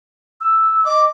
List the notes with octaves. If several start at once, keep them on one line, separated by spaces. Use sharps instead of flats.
E6
D#5 D6